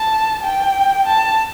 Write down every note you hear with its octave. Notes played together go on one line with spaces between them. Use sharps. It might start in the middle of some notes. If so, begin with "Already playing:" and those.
Already playing: A5
G5
A5